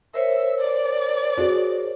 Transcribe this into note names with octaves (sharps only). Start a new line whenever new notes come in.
A#4 C5 C#5 E5
D5
F#4 G#4